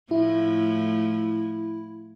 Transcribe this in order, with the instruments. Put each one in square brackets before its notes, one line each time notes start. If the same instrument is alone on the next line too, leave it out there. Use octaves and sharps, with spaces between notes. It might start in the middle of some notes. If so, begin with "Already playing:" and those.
[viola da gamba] A2 F3 A3 [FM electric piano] E4